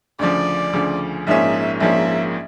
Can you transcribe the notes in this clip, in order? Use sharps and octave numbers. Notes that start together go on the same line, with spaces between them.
D2 C#3 F3 D5
D2 C#3 F3
A#1 G#2 F3 A#3 C#4 E5
A#1 G#2 F3 A#3 C#4 E5